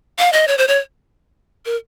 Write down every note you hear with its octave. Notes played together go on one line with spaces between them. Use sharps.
F5
D#5
C#5
C5
C#5
A#4